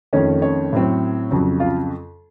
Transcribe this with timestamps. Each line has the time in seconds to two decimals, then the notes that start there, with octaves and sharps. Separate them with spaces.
0.13 F2 D#3 A3 C#4 C#5
0.42 C#4 C#5
0.73 A2 F#3 C4
1.31 F2 C#3 F#3
1.60 F4 F5